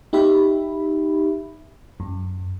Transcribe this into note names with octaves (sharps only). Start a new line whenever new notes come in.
D#4 G4 E5 B5
F#2